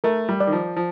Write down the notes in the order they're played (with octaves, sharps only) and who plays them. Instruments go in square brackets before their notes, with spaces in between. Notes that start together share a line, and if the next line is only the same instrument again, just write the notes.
[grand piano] A3 [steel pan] A#4
[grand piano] G3
[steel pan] D5
[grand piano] D#3
F3
F3